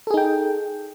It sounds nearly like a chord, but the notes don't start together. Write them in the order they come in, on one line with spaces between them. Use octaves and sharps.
A4 G#4 D#4 G5